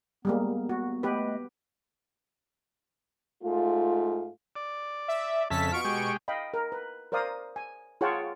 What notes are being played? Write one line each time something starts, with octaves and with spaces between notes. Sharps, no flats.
G3 G#3 A#3 B3
F#4
A3 B3 G4 B4 D#5
G#2 A3 F4
D5
E5
F2 C#3 A4 E5 A5 B6
B2 F4 C#6 D7
G#3 G4
D#5 F5 G5 B5
A#4
B4
A#4 C5 D5 F5 D#6
G#5
F4 G#4 C#5 F#5 G5 A5